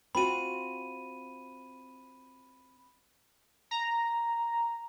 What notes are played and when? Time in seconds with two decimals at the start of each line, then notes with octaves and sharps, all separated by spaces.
0.15 C4 F4 F#4 B5 D#7
3.71 A#5